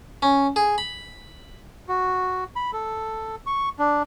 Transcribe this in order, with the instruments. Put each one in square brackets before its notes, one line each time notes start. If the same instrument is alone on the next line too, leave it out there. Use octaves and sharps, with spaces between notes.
[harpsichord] C#4
G#4
B5
[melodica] F#4
B5
A4
C#6
D4